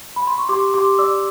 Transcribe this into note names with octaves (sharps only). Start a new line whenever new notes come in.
B5
C6
C#6
G4 C6 D6
G4 C6 D6
D5 D6 E6